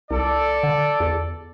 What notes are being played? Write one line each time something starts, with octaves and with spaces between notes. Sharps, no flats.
C2 A4 D5
D3
E2